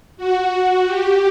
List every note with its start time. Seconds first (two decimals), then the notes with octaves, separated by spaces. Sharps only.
0.17 F#4
0.85 G4